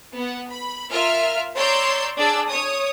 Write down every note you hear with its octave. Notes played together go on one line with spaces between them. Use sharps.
B3 F#5
B5
F4 A#4 E5 F6
C#5 D5 A#5 C6 E6 G6
D4 G#4 D5 E6
C#5 D#6